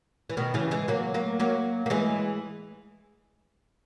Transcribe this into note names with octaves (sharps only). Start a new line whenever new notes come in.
E3
B2 D#3
C#3 E3
E3 G#3
F#3 A#3
F#3 A#3
F#3 A#3
A#3
E3 G#3